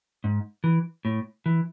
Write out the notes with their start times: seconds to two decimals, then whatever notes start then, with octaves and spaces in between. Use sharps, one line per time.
0.24 G#2
0.64 E3
1.05 A2
1.46 E3